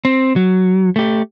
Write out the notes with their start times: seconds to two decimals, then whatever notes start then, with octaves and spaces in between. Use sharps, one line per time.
0.05 C4
0.36 F#3
0.96 A3 G4